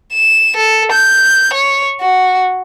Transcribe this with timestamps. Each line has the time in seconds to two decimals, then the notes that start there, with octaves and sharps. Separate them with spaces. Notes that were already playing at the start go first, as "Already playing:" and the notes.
0.13 E7
0.57 A4
0.92 G6
1.53 C#5
2.01 F#4